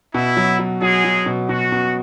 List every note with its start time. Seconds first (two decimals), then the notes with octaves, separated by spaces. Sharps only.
0.14 B2 E4
0.37 F#3
0.59 F#3
0.81 F#3 G#3 G#4
1.05 F#3
1.26 B2
1.49 B2 F#4
1.72 B2